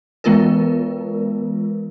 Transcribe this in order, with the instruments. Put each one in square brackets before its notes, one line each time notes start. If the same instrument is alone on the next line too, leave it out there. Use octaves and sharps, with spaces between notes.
[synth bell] E3 G#3 B3 F4 A#4 B4